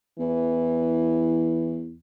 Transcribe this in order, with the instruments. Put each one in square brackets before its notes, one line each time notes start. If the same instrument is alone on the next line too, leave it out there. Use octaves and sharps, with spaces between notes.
[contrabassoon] E2 [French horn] E3